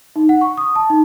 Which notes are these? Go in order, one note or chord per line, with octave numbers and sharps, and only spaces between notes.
D#4
F#5
C#6
D#6
A5
D#4